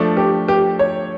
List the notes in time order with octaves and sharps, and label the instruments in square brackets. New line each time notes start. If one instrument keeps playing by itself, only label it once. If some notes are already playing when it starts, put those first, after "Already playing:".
Already playing: [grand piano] F3 A3 D4
[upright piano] G4
G4
C#5